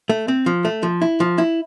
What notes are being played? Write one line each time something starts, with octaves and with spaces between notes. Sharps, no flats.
A3
C4
F3
A3
F3
E4
F3
E4